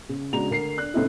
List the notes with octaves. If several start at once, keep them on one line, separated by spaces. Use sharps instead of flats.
C#3
C#3 G#3 D4 F#4 A#5 F7
D2 A#4 C7
D4 F#6
A2 C#3 A3 C4 D#4 E4